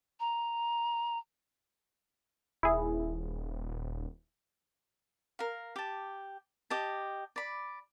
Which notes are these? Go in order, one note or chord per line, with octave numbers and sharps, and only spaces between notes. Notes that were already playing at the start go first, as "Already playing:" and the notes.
A#5
D#1 E4 G#4
A#4 F5
G4 A5
G4 D#5 A5
D5 B5